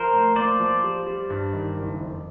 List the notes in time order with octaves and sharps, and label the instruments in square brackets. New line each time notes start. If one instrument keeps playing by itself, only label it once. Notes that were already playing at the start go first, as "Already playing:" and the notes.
Already playing: [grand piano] F3 [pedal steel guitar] A#4 C5
[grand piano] A2
[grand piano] A#3 [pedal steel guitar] C5 D5
[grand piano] F3
G3
G3
G2
D#3
F#1
F2